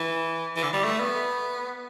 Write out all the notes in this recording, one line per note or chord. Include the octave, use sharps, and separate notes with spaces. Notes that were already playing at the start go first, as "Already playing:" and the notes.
Already playing: E3
E3
D3
G3
A3
B3